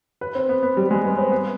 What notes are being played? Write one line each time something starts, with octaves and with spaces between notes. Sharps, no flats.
B4
C4
B3
B3
G3
G#3
B3
C4
B3